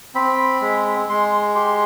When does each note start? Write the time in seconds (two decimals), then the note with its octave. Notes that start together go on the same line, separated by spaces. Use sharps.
0.15 C4 B5
0.61 G#3
1.09 G#3 C6
1.55 G4 C6